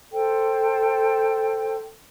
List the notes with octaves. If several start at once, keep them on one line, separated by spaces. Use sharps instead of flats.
A4 C5 G5